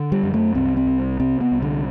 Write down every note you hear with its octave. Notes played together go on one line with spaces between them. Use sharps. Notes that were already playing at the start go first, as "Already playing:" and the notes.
Already playing: D3
G3
F#2
A3
C2 C4
C4
C3
C3 C4
B3
C2
D3